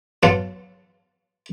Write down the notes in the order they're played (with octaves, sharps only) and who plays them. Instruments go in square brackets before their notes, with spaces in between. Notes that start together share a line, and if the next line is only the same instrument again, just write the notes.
[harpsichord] F#3 B3 F5 F#5 A5 C6